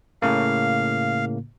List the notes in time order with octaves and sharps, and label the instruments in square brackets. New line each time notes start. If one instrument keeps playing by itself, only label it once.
[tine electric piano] A2 C#3 A#3 [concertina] F5